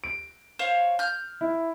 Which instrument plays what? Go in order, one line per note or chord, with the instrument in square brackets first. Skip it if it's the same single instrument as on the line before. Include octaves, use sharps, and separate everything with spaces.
[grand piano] D7
[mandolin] C5 C#5 F5
F6 G6
[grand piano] E4